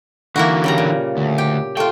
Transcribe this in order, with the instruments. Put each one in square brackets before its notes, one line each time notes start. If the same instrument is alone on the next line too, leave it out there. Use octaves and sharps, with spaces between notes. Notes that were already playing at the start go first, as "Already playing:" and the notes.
[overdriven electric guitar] D3 E3 [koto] A#3 E4 F#4
[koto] C#3 G3 A#5
A#2
[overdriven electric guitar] D2
[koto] G4
[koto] A3 F4 [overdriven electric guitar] G5